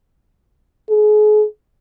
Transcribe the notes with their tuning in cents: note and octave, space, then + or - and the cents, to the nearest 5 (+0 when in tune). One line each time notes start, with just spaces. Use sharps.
G#4 +35